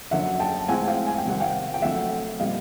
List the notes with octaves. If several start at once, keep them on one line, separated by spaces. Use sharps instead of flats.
F#2 D3 F#3 E5 F#5
G5 A5
A2 E3 G#3 C4 F#5 G#5
F5 G5
G#5
G5
C3 D#3 G3 C4 F#5
F5 G5
G5
D3 F#3 A3 C4 E5 F#5
A#2 G3 C4 D#5 F5